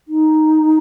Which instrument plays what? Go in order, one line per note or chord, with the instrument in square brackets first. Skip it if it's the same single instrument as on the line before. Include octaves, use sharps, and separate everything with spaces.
[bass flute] D#4